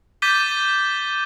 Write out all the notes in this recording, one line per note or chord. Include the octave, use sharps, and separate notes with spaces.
D6 G6 A6 B6 D#7 G7